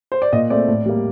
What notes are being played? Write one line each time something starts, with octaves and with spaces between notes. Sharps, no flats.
C5
D5
A#2 D#5
A3 C4 D5
A2
G3 A#3